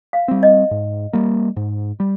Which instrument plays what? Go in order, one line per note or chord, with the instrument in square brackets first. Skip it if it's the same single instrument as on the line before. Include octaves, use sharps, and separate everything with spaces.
[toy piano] F5
[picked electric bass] G3 C4
[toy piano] D#5
[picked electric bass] G#2
G3 A#3
G#2
G3